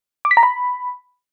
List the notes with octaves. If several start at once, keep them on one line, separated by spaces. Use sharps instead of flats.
D6
B6
A#5
B5